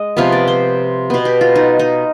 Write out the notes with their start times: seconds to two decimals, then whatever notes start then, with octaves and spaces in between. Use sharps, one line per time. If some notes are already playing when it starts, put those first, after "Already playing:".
Already playing: G#3 D#5
0.17 C3 F3 B3 F5
0.32 D5
0.48 C5
1.10 B2 B3
1.25 G4
1.41 F4
1.55 D#4
1.79 D#4